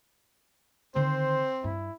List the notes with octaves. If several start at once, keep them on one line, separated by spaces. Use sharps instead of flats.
D3 D#3 C4 C5
G2 E4